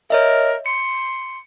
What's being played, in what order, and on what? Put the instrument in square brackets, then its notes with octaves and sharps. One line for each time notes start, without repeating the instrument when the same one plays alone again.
[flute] A#4 [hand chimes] C#5 D#5 E5
[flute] C6 [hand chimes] C#7